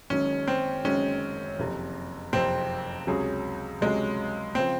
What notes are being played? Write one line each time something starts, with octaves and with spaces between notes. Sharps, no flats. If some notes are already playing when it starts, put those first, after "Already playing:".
F#1 F#2 D#3 G#3 C#4
C4
F#1 F#2 D#3 G#3 C#4
F#1 F2 C3
F#1 F2 C3 C4
C#2 C3 F#3 C#4 G#4
C#2 C3 F#3 G#3 C#4 G#4
C#3 F3 C4